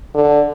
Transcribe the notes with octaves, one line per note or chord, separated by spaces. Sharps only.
D3